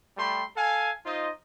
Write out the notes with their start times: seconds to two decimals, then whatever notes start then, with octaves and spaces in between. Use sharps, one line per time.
0.17 G3 A3 G5 B5 C6
0.56 A4 F5 G#5
1.06 D#4 F4 C5 D#5